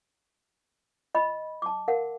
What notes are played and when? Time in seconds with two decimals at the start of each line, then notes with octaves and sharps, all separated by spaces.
1.15 D#5 B5
1.62 A5 D6
1.88 A#4 F5 F#5